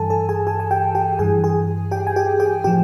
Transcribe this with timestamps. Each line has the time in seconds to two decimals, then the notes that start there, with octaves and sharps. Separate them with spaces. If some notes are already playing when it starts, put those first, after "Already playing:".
Already playing: G2 E3 A4 G#5 A5
0.10 A4 A5
0.29 G#4 G#5
0.47 G#4 G#5
0.60 G#5
0.71 G4 G5
0.95 G4 G5
1.19 G2 E3 G#4 G#5
1.44 G#4 G#5
1.91 G4 G5
2.07 G#5
2.16 G4 G5
2.40 G4 G5
2.64 A2 F3 G4 G5